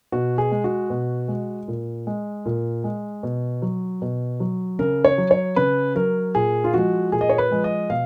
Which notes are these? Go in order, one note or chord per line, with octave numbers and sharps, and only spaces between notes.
B2 F#4
G#4
G#3
F#4
B2
G#3
A#2
G#3
A#2
G#3
B2
F#3
B2
F#3
C#3 A#4
C#5
F#3
C#5
C#3 B4
F#3 A#4
A#2 G#4
F4
F3 G#3 F#4
A#2 G#4
D#5
C#5
B4
F3 G#3
D#5
B2 F5